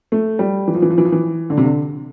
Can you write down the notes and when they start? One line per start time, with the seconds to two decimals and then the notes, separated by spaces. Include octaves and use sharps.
0.12 A3
0.39 G3
0.68 E3
0.75 F3
0.82 E3
0.90 F3
0.98 E3
1.05 F3
1.12 E3
1.50 D3
1.57 C3
1.64 D3